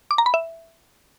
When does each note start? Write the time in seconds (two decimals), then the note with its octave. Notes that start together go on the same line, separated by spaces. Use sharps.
0.11 D6
0.18 A#5
0.26 B5
0.34 E5